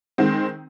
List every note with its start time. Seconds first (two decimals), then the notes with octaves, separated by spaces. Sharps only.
0.18 D#3 G#3 C4